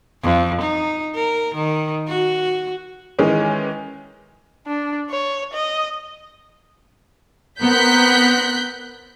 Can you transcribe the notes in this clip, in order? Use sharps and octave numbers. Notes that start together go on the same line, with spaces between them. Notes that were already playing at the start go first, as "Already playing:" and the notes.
F2
D#4
A#4
D#3
F#4
D#3 E3 G#3 C#4
D4
C#5
D#5
B3 C4 A#4 F#6 G6 B6